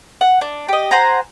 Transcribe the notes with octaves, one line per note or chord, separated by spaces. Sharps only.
F#5
D4
G4 D#5
C5 F#5 G#5 A#5